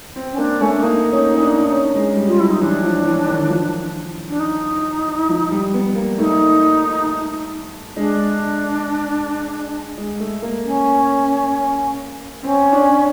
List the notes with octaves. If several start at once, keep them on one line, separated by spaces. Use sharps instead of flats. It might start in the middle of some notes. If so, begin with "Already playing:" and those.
C4
C#4
A#3 D4
A3 C#4
D4
A#3 D#4
C#4
C#4
D4
C#4
G#3
G3
F4
F#3 E4
D#4
E3 D4
F3
E3
D#3
F3
D4
D#4
F3
G3
B3
A#3
A3 D#4
G#3 D4
G#3
A3
A#3
C#4
C4 C#4
D4